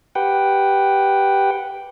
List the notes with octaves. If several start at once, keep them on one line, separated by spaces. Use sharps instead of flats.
G4 B4 F#5 G5